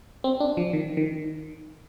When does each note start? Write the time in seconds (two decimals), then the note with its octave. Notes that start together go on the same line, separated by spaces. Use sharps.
0.24 C4
0.40 D4
0.57 F3
0.73 D#3
0.97 D#3